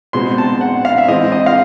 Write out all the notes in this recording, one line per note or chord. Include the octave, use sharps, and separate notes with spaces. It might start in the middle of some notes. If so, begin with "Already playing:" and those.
B2 G#3 C4 C6
A5
F#5
F5
E5
E3 G#3 C4 D#5
D#5
F5